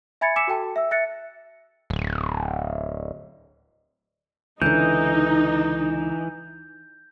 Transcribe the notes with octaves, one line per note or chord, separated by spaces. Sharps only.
E5 G#5 B5 G#6 A6 C#7
G#5 D6 E6 B6 C#7 E7
F#4 A4 G5 A5
E5 E6
E5 F#6 A6 C#7
D1
C#2 D3 E3 D#4 G6